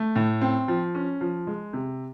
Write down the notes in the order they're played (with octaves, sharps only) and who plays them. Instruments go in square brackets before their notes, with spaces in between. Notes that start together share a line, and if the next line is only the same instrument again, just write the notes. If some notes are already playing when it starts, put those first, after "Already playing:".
Already playing: [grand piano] A3
A2
C4
F3
C#4
F3
G#3
C3